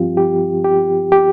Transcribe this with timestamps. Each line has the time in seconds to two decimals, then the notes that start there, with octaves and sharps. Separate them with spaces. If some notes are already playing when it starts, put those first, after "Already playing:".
Already playing: G2 F3 C4 F4 G4
0.17 G4
0.64 G4
1.12 G4